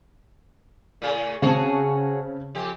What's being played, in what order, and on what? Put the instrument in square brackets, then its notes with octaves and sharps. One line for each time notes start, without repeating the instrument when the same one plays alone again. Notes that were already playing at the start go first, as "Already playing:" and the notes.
[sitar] A2 C#3
[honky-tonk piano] C#3 C4 A5 [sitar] F#4 G#4 C#5
[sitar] F2 G4